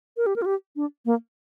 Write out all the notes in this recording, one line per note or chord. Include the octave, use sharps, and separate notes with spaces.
A#4
G4
A#4
F4
G4
D4
A#3